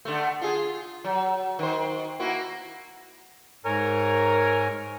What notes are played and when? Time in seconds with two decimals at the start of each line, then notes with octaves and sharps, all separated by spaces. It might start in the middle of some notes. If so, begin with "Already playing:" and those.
0.05 D3 A3
0.42 F4 G#4
1.05 F#3
1.59 D#3 C5
2.20 A#3 E4 F#4
3.65 G#2 A#4 C#5 G#5